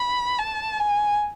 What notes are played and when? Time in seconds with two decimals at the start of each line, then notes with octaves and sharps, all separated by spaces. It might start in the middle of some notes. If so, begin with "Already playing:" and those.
Already playing: B5
0.39 A5
0.79 G#5